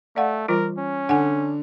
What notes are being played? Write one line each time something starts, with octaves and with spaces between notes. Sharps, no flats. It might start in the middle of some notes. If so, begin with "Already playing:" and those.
A3 D5 F5 F#5
E3 G3 F4 A#4
C#4
D3 F#5 G#5